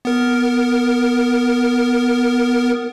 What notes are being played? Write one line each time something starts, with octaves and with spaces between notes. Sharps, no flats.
B3 A#4